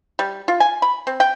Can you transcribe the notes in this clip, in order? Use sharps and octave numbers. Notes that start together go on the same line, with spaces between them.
G3
F4
G#5
B5
C4
G5